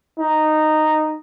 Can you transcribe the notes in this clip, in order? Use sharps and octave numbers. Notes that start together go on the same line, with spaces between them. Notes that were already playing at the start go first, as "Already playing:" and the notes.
D#4